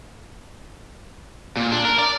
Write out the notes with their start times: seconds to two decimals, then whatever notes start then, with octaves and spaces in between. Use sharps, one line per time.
1.57 A#2
1.72 D4
1.85 A#4
1.99 D5